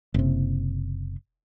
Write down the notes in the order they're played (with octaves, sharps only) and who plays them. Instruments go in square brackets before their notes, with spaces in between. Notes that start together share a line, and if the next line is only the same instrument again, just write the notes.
[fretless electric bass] F#1 C3